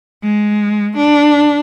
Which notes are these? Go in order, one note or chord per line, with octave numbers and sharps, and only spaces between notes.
G#3
D4